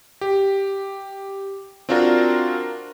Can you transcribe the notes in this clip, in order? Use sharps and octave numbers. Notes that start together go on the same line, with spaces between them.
G4
C4 D4 F4 F#4 A#4